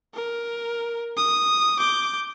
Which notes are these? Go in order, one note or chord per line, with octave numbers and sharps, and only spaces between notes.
A#4
D#6
D6 G6